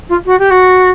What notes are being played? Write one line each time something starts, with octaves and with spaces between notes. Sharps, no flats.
F4
F#4
G4
F#4